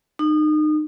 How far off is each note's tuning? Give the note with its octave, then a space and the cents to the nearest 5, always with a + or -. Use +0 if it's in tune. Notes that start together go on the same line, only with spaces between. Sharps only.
D#4 -30